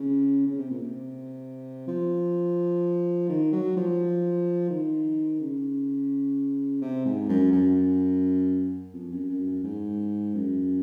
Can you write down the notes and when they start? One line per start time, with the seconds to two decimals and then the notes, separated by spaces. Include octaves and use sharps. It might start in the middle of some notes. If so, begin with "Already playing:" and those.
Already playing: C#3
0.47 C#3
0.58 C3
0.70 A#2
0.82 C3
1.88 F3
3.29 D#3
3.52 F#3
3.77 F3
4.70 D#3
5.41 C#3
6.81 C3
7.05 G#2
7.29 F#2
7.52 F#2
8.93 F2
9.11 F#2
9.29 F#2
9.46 F#2
9.64 G#2
10.34 F#2